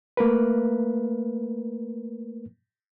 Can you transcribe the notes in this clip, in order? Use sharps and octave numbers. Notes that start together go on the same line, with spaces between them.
A3 A#3 A#4 B4